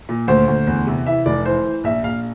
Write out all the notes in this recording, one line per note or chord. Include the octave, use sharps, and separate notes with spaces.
A#2
D2 C5
D2
E2
C3
E3 E5
F1 D5
E3 C5
E3
A#1 E5
A#1 F5